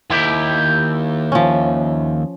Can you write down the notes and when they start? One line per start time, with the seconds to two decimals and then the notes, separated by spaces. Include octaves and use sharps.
0.10 D#2 E4 G4
1.32 F3 C#4